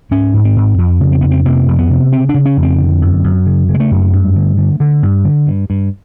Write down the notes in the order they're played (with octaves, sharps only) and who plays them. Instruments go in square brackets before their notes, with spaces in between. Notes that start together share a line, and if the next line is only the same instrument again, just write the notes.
[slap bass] G#2 C#4
G#2
C4
G#2
F2
C#3
C4
F2 B3
C4
C3 A#3
F2
B3
C3
C#3 C4
C#3 D4
C#4
F2
C4
D3
F#2
F#2
C#3
C#3
G#3
A3
F#2
G2
D3
D3
D3
G2
D3
G2
G2